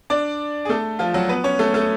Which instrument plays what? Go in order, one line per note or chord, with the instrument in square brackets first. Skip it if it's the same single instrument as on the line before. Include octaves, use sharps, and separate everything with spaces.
[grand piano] D4 D5
G#4
A3 A4
F3 F4
F#3 F#4
B3 B4
C#4 C#5
A3 A4
A3 A4